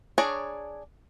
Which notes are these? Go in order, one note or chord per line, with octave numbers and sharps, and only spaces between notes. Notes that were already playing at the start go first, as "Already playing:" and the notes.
D4 G#4 C#5 D5 A#5